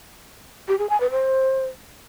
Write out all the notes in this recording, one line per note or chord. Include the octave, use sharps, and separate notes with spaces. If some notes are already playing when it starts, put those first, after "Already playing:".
G4
G#4
G#5
B4
C5